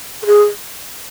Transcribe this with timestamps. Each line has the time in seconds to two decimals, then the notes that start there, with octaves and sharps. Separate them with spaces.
0.23 A4
0.26 G#4